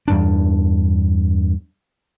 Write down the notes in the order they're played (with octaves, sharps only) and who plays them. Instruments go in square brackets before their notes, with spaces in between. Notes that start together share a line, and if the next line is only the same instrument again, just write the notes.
[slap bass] E2 G2 D4